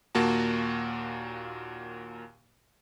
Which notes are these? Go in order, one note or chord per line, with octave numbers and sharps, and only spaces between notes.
D#2 A#2 A#3 F#4 A5